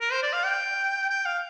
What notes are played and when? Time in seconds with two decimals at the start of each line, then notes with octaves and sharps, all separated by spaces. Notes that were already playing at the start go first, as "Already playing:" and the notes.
0.01 A#4
0.12 C5
0.23 D5
0.33 F5
0.44 G5
1.10 G5
1.26 F5